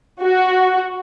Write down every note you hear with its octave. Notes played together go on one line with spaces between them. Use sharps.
F#4